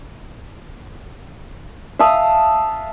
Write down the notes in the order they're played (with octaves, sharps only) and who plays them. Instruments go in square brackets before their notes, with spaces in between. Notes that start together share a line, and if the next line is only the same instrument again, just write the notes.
[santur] E5 F5 A5 D#6